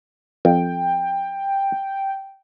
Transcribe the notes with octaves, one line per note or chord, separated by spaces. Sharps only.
F2 G5